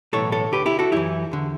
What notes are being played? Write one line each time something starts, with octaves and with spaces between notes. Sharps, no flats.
B1 A2 E3 A4 C#5
A4 C#5
D2 D3 G4 B4
E4 G4
F#4 A4
F#2 E3 E4 G4
E2 D3